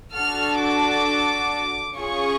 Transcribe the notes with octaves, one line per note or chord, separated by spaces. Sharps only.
D4 F#4 A4 F6
D6
C#4 F4 G#4 C#6